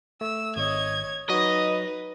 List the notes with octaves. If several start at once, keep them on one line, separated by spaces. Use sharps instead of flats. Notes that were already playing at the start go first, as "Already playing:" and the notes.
A3 E6
G#1 C#5 D#5 G#6
F#3 D#4 F#4 B4 D#5